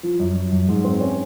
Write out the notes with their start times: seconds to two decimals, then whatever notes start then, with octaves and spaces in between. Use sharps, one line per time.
0.03 F3
0.20 F#2
0.36 F#2
0.52 F#2
0.69 G#2
0.84 C4
1.01 C#4